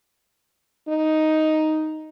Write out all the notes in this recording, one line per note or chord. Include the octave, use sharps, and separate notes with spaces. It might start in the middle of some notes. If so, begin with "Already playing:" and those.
D#4